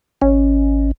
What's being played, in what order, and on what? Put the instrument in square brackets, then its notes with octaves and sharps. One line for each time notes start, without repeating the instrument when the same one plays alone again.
[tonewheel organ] G#1 [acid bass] C#4